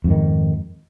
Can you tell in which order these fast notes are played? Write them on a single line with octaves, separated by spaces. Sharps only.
F2 G#2 D#3